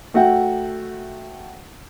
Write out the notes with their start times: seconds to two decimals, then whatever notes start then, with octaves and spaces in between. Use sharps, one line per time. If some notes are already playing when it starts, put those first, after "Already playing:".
0.14 A3 F#4 E5 F#5 G5